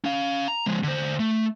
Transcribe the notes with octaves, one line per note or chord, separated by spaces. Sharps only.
C#4 F5
A#5
F3 G#3
D3 C5
A3